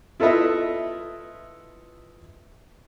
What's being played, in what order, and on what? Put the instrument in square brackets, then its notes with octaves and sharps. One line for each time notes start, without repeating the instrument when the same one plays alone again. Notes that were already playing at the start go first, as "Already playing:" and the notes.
[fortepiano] E4 F4 A4 B4 D#5 E5